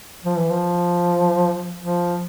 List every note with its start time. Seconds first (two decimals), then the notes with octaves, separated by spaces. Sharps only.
0.25 F3
0.37 E3
0.50 F3
1.81 F3